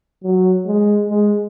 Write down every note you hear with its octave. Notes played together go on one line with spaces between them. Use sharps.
F#3
G#3
G#3